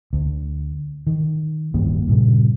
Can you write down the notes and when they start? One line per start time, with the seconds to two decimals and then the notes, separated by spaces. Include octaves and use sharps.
0.13 D2
1.07 D#3
1.74 D1 G2 D#3 A#3
2.08 G2 A#2 C#3